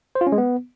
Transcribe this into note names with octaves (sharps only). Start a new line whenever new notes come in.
C5
F4
C#4
G#3
B3